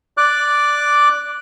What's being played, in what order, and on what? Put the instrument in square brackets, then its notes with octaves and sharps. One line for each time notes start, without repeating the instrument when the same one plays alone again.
[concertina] D5 D6 F#6